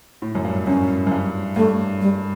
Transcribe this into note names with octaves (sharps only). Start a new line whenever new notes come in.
A2
F#2
G2
F#2 C#4
F#2
G2
G2 A3
G3